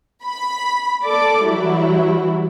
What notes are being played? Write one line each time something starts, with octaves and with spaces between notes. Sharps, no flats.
B5
A4 D5 D6
E3 F#3 G3 E4